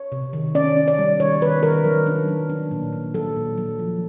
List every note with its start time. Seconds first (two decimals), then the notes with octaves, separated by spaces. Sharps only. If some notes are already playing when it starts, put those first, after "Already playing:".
Already playing: C#5
0.12 C3
0.33 D#3
0.55 C#4 D5
0.77 C#4
0.88 D5
0.98 G3
1.20 D#3 C#5
1.42 D#3 B4
1.63 D#3 A#4
1.85 F#3
2.06 D4
2.28 F#3
2.50 D4
2.71 A#2
2.93 A#2
3.14 F#3 A4
3.36 A#2
3.58 F#3
3.79 F3